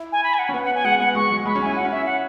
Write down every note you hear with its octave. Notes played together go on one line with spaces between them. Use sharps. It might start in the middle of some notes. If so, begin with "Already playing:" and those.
Already playing: E4
G#5
B5
G#5
F#5
C#4
B3 F#5
F#5
G#5
G#3 F#5
B3 F#5
G#3 C#6
F#3
G#3 B5
C#4
E4 G#5
E4 F#5
C#4
E4 E5
F#5